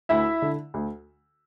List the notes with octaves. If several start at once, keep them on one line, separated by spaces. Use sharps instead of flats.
D2 E4 E5
D3
D2